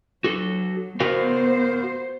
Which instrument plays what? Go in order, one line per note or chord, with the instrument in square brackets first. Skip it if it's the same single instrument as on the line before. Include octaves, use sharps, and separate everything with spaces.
[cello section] F#3 [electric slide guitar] F#4 A4
[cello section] B3 C5 [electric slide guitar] F#4 A#4 F5